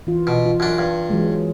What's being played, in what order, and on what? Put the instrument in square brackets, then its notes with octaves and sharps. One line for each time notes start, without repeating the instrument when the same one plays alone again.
[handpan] E3 F4
[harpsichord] B2
[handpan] F4
[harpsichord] F#2 D4
G2
[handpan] E3 F#3 G#3